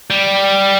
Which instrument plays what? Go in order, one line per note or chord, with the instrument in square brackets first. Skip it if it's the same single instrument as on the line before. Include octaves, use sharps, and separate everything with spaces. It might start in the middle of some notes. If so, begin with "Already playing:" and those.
[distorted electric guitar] G3